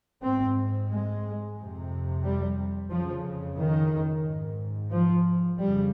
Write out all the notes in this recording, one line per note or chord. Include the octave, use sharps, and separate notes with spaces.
G#2 C4
G#3
F2 C3
G3
F2 C#3 F3
D#3
G#2
F3
F2 C#3 G3